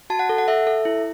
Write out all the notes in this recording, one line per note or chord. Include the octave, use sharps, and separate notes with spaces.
F#4 A5
F#5
A4
F#5
A4 E5
A4
E4